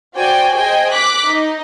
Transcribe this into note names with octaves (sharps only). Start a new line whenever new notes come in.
F#4 C5 D5 G5 G#5
G#4 C5 D#5 G5 G#5
D6 F#6 B6
D#4 D#5